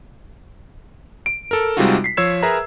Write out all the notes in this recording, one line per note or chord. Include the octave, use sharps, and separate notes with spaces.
D7
A4 A#4
C3 G3 G#3 D#4 F4 F#4
B6 C7
F3 C#5 E6 G#6 E7
G#4 A#4 B4 E5 A#5